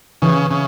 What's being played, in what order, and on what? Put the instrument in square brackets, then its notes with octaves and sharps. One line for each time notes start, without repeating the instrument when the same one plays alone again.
[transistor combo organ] C#3 [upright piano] E3
[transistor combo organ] C#3